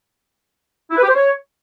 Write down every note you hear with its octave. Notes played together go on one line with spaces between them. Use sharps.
E4
B4
G4
C5
C#5